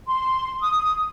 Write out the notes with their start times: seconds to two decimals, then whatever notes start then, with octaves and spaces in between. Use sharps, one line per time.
0.07 C6
0.60 D#6